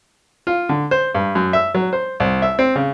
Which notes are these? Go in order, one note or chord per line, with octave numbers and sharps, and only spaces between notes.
F4
D3
C5
G2
F#2
E5
F#3
C5
C2
E5
C4
C#3